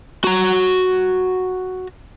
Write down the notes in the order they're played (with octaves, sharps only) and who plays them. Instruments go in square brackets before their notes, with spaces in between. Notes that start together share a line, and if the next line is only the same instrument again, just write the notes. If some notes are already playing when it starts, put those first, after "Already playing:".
[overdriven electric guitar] F#4 A#5